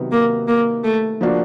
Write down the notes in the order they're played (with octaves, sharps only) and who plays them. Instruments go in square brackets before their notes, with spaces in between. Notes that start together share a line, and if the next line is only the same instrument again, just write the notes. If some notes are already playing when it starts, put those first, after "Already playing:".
Already playing: [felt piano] C3 D#3 F#3 B3
[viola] A#3
A#3
A3
[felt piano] F3 A#3 D4 F#4